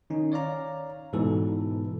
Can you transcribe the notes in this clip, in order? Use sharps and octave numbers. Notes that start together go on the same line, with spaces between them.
D#3 C#4 D#4
C#5 D5 F5 A#5
G#2 B2 E3 A4